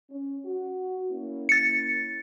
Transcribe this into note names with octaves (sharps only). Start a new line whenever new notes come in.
C#4
F#4
A#3 C#4 E4
A6 C#7